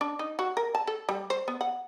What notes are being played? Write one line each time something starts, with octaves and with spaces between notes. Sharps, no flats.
D4
D#4
F#4
A#4
A5
A4
G3
C5
B3
F#5